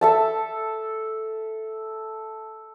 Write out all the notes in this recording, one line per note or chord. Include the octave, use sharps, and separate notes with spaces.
A4 E5 A5